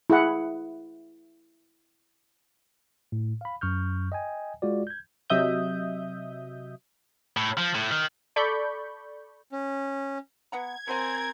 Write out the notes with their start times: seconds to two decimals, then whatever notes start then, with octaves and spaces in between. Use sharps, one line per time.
0.10 E4 G#4 F#5
3.12 A2
3.41 F5 B5
3.61 F#2 C#6 F6 G6
4.12 D#5 G5 G#5
4.62 G#3 F4 F#4 D5
4.87 G6 G#6
5.30 C3 F#3 D#5 E5 D#6 G6
7.37 A2
7.57 F3
7.75 A2
7.91 D#3
8.36 A4 D5 B5 C#6 G6
9.52 C#4
10.52 B3 F#5 A#5 G#6
10.88 F#3 C4 A#4 C5 G#5